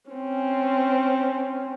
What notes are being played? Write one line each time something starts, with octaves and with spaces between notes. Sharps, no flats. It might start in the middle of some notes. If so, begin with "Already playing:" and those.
C4 C#4